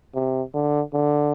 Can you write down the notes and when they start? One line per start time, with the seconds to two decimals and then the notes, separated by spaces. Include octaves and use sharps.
0.15 C3
0.54 D3
0.93 D3